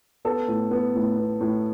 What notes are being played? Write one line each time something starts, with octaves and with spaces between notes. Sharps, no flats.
B3 A4
A2
B3
A2
B3
A2